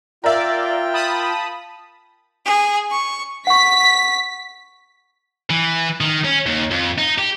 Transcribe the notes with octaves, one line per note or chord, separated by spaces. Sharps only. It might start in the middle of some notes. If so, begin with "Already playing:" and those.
F4 A#4 D5 E5 G5
A5 B5 D#6
G#4
C#6
F#5 C#6 B6
E3
D#3
C#4
D#2
F2
D#4
G4